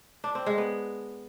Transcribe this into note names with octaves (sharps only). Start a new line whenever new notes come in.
D4
C4
G#3
B3